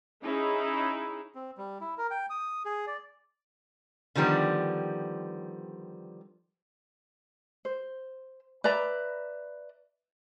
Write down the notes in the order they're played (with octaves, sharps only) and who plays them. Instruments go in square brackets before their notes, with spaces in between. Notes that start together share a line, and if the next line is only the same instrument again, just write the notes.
[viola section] C#4 D#4 E4 G#4
[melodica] C4
G3
E4
A#4
G5
D#6
G#4
D5
[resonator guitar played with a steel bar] D3 D#3 F3 G3 B3
[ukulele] C5
B4 D5 E5 A#5